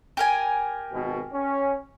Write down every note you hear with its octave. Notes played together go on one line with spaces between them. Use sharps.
G4 A#4 G#5
G#1 B2
C#4